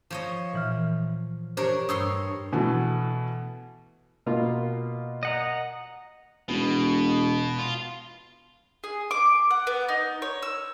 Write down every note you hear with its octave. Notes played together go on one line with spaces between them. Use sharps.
F3 C#5 D#5
A#2 E3 F6
D4 G4 A#4 C5 C#5
G2 C#5 C6 D#6 E6
B2 E3 A3
B2 A#3 F4
D#5 F#5 A#5
E1 B2
F4
G#4
D6
F#5
B3
D#4
C#5
E6